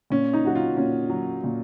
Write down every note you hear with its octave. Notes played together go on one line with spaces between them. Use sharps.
A#2 C#4
D#4
F#3 F#4
F4
A#2 C#4
F#3
A#2